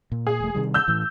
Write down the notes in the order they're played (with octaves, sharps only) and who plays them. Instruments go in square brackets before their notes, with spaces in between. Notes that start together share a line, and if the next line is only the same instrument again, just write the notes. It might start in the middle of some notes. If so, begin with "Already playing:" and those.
[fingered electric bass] A#2
[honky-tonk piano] G#4
[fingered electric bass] E1 A3
C3 D#3 G3
[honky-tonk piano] E6 G6
[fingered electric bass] A2 E3